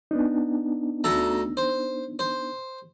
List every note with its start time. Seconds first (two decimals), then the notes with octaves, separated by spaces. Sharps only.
0.11 B3 D4 D#4
1.04 D2 A4 A#5
1.57 C5
2.19 C5